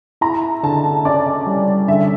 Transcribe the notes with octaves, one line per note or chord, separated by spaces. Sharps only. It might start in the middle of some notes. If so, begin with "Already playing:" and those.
E4 A#5
D3 A5
C#4 D5
G3
D3 E5